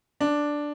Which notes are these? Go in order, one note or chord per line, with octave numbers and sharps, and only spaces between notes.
D4